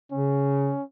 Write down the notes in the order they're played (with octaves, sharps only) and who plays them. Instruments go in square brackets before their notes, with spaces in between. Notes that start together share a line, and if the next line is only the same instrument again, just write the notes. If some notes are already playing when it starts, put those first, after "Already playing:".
[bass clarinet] C#3 [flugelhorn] C#4